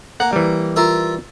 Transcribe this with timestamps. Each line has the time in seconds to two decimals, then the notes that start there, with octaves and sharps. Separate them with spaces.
0.20 A#3 F#5
0.33 E3 G3
0.76 F4 A#4 E5